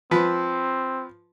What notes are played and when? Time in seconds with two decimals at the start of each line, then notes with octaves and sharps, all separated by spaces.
0.11 F3 C4 B4